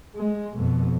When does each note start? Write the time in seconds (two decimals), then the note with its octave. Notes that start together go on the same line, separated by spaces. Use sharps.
0.16 G#3
0.57 F2 B2